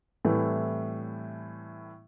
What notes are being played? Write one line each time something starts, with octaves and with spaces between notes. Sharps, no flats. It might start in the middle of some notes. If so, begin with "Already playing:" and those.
A2 E3 G3 A3 C4